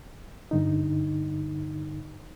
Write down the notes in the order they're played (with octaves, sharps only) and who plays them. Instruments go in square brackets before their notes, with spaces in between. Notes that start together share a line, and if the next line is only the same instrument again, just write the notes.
[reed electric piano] G2 D3 D#4